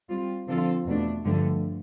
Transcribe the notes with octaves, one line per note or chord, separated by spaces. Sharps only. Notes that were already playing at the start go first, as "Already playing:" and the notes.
G3 C4 F4
D3 F3 C4 F4 A4
E2 B2 A3 D4
G2 D3 F3 A3